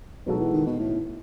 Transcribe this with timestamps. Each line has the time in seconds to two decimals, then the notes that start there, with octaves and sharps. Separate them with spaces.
0.26 B2 F#3 G#3 D#4 F#4 A4
0.40 E3
0.53 D#3
0.66 B2
0.79 A2